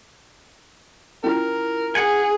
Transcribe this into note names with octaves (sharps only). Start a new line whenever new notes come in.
C#4 E4 F4 A#4
G#4 F#5 G#5